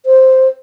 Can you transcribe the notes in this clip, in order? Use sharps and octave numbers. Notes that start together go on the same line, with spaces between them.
C5